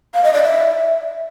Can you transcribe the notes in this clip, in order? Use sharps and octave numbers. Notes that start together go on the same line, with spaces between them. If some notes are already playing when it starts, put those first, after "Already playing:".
F5
D#5
D5
E5